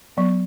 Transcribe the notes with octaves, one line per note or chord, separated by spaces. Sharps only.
F#3 B3